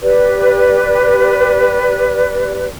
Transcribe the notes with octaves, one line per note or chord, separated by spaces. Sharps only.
G4 B4 D5